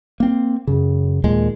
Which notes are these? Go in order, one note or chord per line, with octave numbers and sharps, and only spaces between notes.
A#3 C4
F#2 C#3
D#2 A#2 G#3